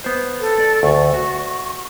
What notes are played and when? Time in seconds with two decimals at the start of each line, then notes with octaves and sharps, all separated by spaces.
0.04 B3 C5
0.40 A4
0.60 D5
0.83 D2 C#6
1.14 F#4